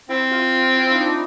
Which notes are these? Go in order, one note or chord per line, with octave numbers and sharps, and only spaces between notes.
C4 E4
F4
F4
E4
D4
D#4